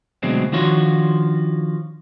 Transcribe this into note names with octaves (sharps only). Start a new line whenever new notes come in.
D2 B2 F#3 G#3 C4 D4
D#3 F3 D4 F4 F#4 C#5